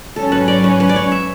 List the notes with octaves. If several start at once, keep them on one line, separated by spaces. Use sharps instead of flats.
G#2 F#3 C#4 A4
B4
D5
B4
B4
D5
C#5
E5